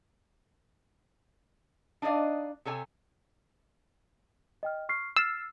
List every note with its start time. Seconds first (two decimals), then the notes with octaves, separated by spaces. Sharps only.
2.02 D4 D#4 D5 D#5 F5
2.65 C3 A4 C#5 G#5
4.63 D#5 G5 F6
4.89 C#6 F6 C7
5.16 E6 F6 A6 C7